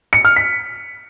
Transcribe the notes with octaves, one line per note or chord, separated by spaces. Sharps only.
C#7
F6
B6